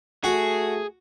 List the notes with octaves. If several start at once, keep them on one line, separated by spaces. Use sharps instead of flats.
A3 F#4 G#4